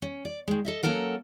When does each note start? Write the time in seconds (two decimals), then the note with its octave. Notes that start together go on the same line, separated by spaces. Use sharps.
0.02 C#4
0.25 D5
0.48 D#3 G#3
0.65 A4 D#5 E5
0.83 F#3 A#3 C#4 A4 A#4 F#5